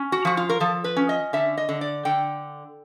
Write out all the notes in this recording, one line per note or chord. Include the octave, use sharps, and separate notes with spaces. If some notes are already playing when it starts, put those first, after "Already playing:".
Already playing: C#4
F#4
F3 F#4
F4
A#4
F3 A4
B4
C#4
D#5
D3 E5
D#5
D3
D5
D3 G5